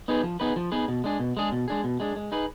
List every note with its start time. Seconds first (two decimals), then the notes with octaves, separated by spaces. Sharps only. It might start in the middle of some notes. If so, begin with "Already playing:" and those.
0.08 B3 D#4 G#4 B4
0.23 F3
0.40 B3 D#4 G#4 B4
0.56 F3
0.72 B3 D#4 G#4 B4
0.88 B2
1.04 G#3 D4 G#4
1.20 B2
1.37 G#3 D4 G#4
1.52 B2
1.68 G#3 D4 G#4
1.84 B2
2.00 G#3 D4 G#4
2.16 G#3
2.32 D#4 G#4 B4